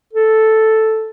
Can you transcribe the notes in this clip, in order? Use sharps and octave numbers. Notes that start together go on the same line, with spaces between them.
A4